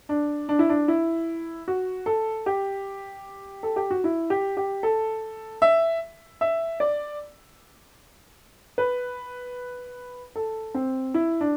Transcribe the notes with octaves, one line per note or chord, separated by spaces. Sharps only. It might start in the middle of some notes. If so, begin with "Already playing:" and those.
D4
D4
E4
D4
E4
F#4
A4
G4
A4
G4
F#4
E4
G4
G4
A4
E5
E5
D5
B4
A4
C4
E4
D4